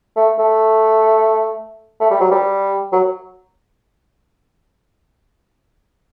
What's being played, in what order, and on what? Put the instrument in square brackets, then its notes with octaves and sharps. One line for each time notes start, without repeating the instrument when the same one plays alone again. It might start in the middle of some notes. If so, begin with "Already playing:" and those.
[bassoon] A3
A3
A3
G3
F#3
G3
F#3